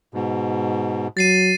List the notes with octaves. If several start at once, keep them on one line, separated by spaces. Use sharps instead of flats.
G#2 B2
F#3 A6 C7 D#7